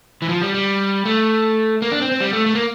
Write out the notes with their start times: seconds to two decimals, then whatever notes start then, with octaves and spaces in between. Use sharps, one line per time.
0.22 E3
0.29 F3
0.42 G3
0.54 G3
1.05 A3
1.82 A#3
1.92 D4
2.01 C4
2.11 C4
2.21 G3
2.33 A3
2.46 A3
2.55 A#3